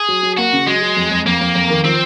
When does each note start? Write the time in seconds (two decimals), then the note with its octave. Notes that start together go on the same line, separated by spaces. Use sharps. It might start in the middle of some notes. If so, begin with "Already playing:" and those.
Already playing: G#4
0.08 F#3
0.23 F#3
0.38 A#3 F#4
0.53 C#3
0.67 F#3 G#3
0.82 F#3
0.97 F2
1.11 F2
1.26 F2 A#3
1.41 F2
1.55 F2
1.70 D#3
1.84 F3 C4